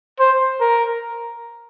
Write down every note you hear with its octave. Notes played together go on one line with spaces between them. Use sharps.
C5
A#4